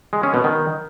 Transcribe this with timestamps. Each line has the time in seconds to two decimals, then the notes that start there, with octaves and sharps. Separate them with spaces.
0.13 G#3
0.23 C#4
0.34 B2
0.44 D#3